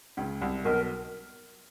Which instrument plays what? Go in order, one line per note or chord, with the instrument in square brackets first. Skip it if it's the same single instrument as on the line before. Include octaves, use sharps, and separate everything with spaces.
[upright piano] C#2 C#3
C2 C3
[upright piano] B1 B2 [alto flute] A#4